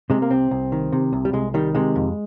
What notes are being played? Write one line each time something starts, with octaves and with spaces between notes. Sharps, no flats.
C3 G#3
A#3
C2 C4
C2
D#3
C3
C2
G3
C2 G#3
D#3 G3
C3 G#3
F2